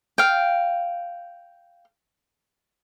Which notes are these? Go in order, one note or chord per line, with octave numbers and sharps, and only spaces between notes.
F5 G5